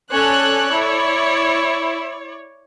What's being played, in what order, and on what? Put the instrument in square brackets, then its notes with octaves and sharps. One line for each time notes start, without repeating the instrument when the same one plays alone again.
[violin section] C#4 A4 F#6 [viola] C#5 D5
[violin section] E4